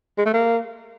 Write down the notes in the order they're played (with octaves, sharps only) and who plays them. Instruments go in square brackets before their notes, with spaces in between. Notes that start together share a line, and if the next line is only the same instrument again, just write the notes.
[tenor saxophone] G#3
A3
A#3